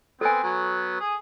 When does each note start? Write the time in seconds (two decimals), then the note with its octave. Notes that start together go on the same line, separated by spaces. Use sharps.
0.21 B3 C4 A4 G#5
0.43 F#3 B3
1.00 G#4 D#6